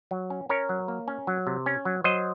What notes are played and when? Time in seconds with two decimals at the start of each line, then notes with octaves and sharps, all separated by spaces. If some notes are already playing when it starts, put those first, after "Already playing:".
0.11 F#3
0.30 C#4
0.49 C#4 A#4 C#5
0.69 F#3
0.88 A#3
1.08 C#4
1.27 F#3
1.47 C3
1.66 C#4
1.85 F#3
2.04 F#3 C5 D#5